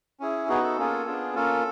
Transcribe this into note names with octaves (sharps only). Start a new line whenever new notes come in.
C#4 E4 G#4
B3 D#4 F#4 G#4
A4
A#3 C#4 F4 G#4
B3 D4 F4 G#4
A#3 C#4 F4 A4